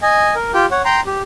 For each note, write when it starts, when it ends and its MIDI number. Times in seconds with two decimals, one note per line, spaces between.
0.02 0.35 75
0.02 0.35 80
0.35 0.52 70
0.54 0.66 65
0.54 0.66 67
0.54 0.66 79
0.71 0.82 73
0.71 0.82 78
0.85 1.00 79
0.85 1.00 82
0.85 1.00 84
1.06 1.22 67